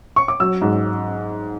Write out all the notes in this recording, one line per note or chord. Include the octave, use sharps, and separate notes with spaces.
C#6
D6
F#3 E6
G#2